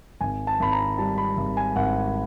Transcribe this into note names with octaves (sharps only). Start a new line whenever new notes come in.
G#1 G#5
A5
G#1 B5
A#5
G3 A5
B5
G#1
G#5
G#1 F#5